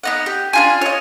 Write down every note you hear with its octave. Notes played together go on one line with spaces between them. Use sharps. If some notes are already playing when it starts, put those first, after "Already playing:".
B3 D#4 F#5
G4
D4 F4 G#5
C#5 D#5